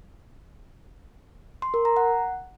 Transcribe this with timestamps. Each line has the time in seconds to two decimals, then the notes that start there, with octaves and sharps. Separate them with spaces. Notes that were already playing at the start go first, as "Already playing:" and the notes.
1.62 C6
1.74 A#4
1.85 A#5
1.97 F#5